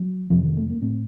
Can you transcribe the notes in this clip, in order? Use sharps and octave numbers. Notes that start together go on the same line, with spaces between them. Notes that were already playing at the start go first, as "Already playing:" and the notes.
Already playing: F#3
F2 C3 F3
D#3
A3
A#3
A2 C4